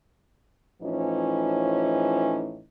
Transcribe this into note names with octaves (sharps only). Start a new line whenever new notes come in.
A2 E3 F3 C#4 D#4